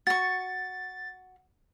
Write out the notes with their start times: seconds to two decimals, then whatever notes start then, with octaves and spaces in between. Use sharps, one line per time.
0.07 F#4 C#6 A6